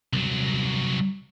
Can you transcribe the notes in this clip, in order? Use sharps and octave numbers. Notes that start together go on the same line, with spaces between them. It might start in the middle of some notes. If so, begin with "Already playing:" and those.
C2 F#3